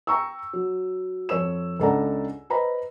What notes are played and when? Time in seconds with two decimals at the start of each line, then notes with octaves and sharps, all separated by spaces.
0.07 G5 A#5 C#6 E6
0.53 F#3
1.29 F2 C#5 E6 E7
1.80 C#2 D4 A4 D5 F#5 A#5
2.50 B4 C5 D#5 A#5 B5